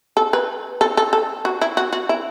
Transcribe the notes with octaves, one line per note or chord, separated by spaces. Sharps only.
A4
B4
A4
A4
A4
F#4
E4
F#4
F#4
E4